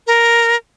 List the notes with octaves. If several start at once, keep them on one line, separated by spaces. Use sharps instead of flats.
A#4